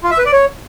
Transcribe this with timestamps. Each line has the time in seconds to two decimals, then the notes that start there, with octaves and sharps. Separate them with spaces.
0.03 F4
0.11 E5
0.18 B4
0.26 D5
0.33 C#5